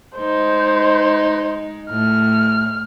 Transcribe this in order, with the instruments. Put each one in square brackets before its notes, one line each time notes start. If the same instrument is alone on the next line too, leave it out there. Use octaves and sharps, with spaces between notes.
[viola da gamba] G#3 D#4 [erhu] C5
[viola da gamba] A2 [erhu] F6